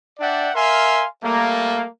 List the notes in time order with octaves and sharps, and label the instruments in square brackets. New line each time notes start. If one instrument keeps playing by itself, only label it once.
[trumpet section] D4 D5 E5 F#5 G5
A#4 E5 F5 G#5 C6
G3 A3 A#3